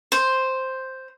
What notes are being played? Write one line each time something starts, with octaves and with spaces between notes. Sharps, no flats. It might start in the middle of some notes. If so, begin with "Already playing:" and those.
C5